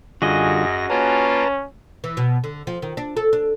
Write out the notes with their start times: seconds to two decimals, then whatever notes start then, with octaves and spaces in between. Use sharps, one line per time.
0.22 F#2 D3 G3 F4 F#4 G#4 D#5 A#6
0.90 A#3 C#4 F4 B4 A5 A#5
2.04 E3
2.17 B2
2.44 D3
2.67 F3
2.82 D#3
2.97 D4
3.17 A4
3.33 D4